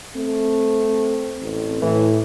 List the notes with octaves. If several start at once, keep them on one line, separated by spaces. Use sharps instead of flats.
A3 C4
A1
A2 E3